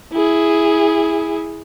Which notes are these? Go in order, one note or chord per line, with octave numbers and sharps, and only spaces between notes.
E4 G#4